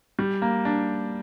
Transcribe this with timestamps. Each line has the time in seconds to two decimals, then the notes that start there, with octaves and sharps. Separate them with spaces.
0.19 G3
0.42 A#3
0.65 D4